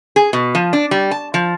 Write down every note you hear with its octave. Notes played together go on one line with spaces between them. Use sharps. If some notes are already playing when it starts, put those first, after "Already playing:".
G#4
B2
F3
D4
G3
A5
F3